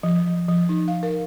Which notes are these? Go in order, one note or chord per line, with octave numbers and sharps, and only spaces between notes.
F3
F3
D#4
F5
A#4